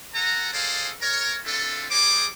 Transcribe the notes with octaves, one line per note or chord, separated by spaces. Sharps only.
A4 F#5 G#5 A#5
G#4 A4 C5 D5 D#5 F5
A#4 C#5
C4 D4 E4 F4 A4
G3 G#4 C5 C#5 D#5 D6